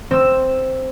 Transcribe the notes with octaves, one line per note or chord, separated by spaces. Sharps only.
C4 E6